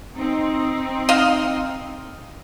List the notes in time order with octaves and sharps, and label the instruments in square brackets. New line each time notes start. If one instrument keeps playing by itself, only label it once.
[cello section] C4 D#4
[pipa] D#5 F5